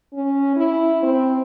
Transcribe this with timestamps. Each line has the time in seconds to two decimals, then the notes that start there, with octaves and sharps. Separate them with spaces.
0.13 C#4
0.56 E4
1.03 C4